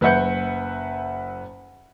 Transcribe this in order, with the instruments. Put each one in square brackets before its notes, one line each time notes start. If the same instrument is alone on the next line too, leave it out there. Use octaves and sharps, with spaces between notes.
[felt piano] F#1 B4 E5 F#5 G6 C#7